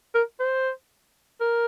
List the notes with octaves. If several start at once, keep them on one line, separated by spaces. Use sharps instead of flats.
A#4
C5
A#4